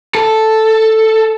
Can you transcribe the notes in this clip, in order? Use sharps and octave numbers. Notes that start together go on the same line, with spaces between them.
A4